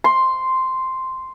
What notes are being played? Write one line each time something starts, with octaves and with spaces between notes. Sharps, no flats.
C6